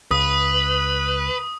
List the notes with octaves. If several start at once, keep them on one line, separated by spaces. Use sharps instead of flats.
C#2 B4 D#6